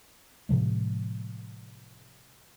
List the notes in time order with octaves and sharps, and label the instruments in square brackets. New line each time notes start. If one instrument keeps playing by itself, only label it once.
[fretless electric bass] A2 C3 F3 G#3